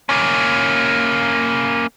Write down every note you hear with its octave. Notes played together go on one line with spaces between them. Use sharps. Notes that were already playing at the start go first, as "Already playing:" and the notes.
A#3 C#4